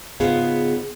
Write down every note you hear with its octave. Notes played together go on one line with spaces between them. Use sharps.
G#2 C#3 B3 F4 G#4 F5